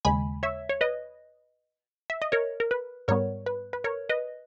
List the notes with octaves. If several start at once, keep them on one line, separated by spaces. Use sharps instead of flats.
D#2 C#3 G#3 G#5 B5
C#5 E5
C#5
B4 D#5
E5
D#5
A#4 C#5
A#4
B4
G#2 G3 B3 A#4 C#5
B4
B4
A#4 C#5
B4 D#5